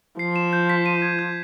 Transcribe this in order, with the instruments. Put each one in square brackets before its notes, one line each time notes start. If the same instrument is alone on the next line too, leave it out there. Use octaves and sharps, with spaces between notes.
[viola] F3 [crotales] C7
[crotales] E7
G6
B6
D#7
G#6
G6